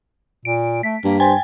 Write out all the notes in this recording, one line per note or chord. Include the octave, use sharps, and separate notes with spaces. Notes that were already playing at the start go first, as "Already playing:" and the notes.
A#2 D7
A3 B6
G2 A#3
C5 G5 G#5